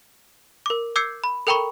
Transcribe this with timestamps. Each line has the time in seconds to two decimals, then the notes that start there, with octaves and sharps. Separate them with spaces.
0.66 A#4 D6
0.96 D6 E6 G6 G#6 C7 C#7
1.24 B5
1.47 A4 A#4 G5 A#5 B5 C#6